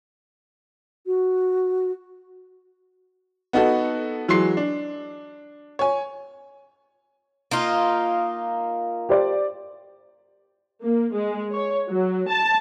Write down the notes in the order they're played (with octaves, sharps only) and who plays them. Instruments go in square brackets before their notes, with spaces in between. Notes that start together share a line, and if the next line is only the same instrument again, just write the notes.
[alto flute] F#4
[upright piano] B3 D#4 F#4 A4
E3 F#3 G#3 C6 C7
D4
C#5 G#5
[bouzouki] A#3 D#4 F4
[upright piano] G4 C5 D5
[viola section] A#3
G#3
C#5
F#3
A5